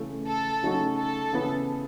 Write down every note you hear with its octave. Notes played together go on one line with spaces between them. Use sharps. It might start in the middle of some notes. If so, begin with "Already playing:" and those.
Already playing: C#3 E3 A3
A4
C#3 F#3 A3 D#4 F#4
A4
C#3 E3 B3